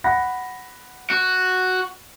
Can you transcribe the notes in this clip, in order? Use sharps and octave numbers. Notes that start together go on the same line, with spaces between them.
F#5 B5 A#6
F#4